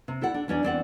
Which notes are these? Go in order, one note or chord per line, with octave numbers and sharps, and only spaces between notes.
C3
E4 A4 D5 F#5
D4
E2 C#4 D4 D5
E2 C4 D5 F#5